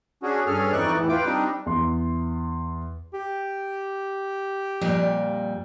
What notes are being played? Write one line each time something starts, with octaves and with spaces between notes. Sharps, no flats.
C#4 D4 F#4 G#4
G2 C#4 G#4 A4 F6
F2 E3 D#4 D5 C#6 F#6
E2 A2 E3
F4 B4 G5 D6
G3 C4 D4 D#4
E2 C6
G4
F2 A#2 G3